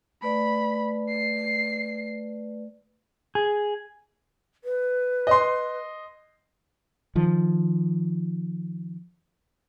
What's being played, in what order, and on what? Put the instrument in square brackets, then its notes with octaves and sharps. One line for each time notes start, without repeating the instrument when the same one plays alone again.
[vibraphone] A3 B4 D5 [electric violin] B5
[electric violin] C7
[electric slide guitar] G#4
[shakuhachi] B4
[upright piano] D#5 C6
[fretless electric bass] D#3 F3